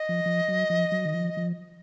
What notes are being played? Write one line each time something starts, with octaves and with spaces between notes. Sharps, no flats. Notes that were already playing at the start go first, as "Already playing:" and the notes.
Already playing: D#5
F3
F3
F#3
F3
F#3
D#3
F3
F3